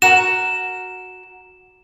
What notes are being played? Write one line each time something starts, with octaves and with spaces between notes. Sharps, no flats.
F#4 A#4 E7